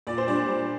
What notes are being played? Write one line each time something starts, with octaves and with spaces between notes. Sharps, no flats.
A#2 D5
C5
G3 D4 D5
G3